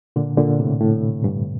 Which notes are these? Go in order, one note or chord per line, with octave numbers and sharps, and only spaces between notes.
A#2 D3
A#2 D3
A2 C3
A2
G2